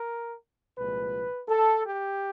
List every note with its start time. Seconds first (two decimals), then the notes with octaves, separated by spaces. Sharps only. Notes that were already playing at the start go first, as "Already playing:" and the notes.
Already playing: A#4
0.77 C2 A#2 F3 G#3 B4
1.48 A4
1.85 G4